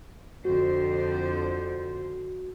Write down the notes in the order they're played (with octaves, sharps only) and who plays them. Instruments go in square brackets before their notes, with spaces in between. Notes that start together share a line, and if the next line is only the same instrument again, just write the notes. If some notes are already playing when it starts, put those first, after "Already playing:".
[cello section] F2 D3 C5 [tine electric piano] F#4